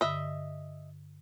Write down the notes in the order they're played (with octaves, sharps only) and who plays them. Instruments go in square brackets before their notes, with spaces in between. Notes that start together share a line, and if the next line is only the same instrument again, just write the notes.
[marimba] G2 D3 [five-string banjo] D#5 E5